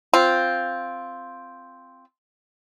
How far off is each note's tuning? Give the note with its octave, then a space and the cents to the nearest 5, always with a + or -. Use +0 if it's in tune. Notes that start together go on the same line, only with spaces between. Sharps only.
C4 +0 F4 +0